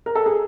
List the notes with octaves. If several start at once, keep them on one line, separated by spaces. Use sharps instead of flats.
A#4
A4
G#4